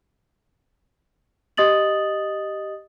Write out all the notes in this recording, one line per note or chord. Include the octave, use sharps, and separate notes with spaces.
G4 D#5 D#6 A6 F#7